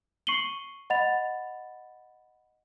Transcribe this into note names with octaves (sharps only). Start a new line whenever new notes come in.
C#6 C7 C#7 D#7 F#7 G7
D#5 F#5 B5 A6 F7